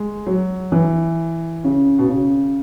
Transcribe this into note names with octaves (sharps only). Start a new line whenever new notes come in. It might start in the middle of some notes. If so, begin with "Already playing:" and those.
Already playing: G#3
F#3
E3
C#3
B2
C#3